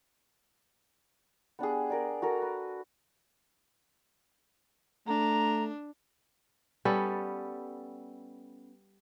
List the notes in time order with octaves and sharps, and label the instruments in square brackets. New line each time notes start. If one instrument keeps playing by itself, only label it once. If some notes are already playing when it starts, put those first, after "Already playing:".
[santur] B3 D4 G4 G#4
G#4 A#4 D5
F#4 A4 A#4
B4
[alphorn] A3 [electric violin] D4 [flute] A#5
[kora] G3 B3 C#4 A4